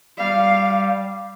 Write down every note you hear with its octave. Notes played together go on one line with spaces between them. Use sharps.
G3 F5